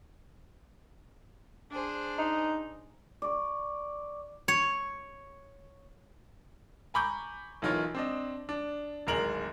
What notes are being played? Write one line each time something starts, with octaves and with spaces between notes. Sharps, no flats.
D4 G#4 C5
D#4
D5 C#6
C#5
G#5 A#5 B5 C#6 D6 G6
B1 E3 D#4 F4 A#4 C#5
C4 D4 D#5
D4
D1 G#1 G#3 A#4 F7 F#7